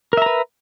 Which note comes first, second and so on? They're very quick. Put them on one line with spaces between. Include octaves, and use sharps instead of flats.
A#4 E5 A#5 B4